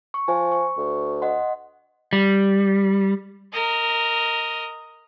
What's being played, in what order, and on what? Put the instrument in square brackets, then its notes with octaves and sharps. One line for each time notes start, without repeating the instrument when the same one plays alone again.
[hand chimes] C#6
[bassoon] F3 [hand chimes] C5 G#5
[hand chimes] C#6
[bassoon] D2
[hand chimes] D#5 F#5 C6
[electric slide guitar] G3
[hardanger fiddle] A#4 D#5